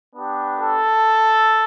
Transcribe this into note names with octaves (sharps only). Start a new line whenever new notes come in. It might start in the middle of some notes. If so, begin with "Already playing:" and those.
B3 D4 G4
A4